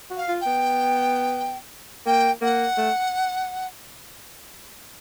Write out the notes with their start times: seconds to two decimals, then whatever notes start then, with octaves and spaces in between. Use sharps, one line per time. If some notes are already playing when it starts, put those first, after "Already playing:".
0.11 F#4
0.17 F5
0.28 F4
0.41 G5
0.46 B3
2.06 A#3 G5
2.41 A#3 F#5
2.77 A3